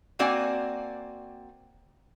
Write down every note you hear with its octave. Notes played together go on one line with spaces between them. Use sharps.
A#3 C4 F#4 D5 F#5 G#5